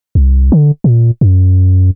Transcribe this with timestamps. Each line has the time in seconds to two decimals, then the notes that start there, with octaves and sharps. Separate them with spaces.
0.15 C2
0.52 D3
0.84 A#2
1.21 F#2